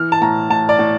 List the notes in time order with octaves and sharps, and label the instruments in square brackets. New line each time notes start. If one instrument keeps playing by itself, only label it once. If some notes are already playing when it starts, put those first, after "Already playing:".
Already playing: [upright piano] E3 F6
A5
A2 A#5
A2 A5
D5
A2